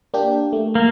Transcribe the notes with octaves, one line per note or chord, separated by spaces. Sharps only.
A#3 D4 G4
A3
A#3